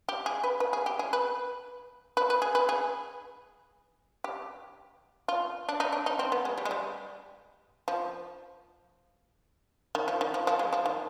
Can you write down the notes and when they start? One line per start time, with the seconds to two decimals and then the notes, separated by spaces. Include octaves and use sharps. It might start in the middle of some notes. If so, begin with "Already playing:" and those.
0.09 G4
0.26 G#4
0.44 B4
0.60 B4
0.73 G#4
0.86 G4
0.99 G#4
1.13 B4
2.17 B4
2.30 B4
2.42 G#4
2.55 B4
2.69 G#4
4.24 G4
5.28 F4
5.69 D4
5.80 D#4
5.92 D4
6.06 D#4
6.19 C4
6.32 B3
6.45 G#3
6.58 G3
6.65 G#3
6.71 G3
7.88 F3
9.95 D#3
10.08 F3
10.21 D#3
10.34 F3
10.47 F3
10.59 G#3
10.73 F3
10.86 D#3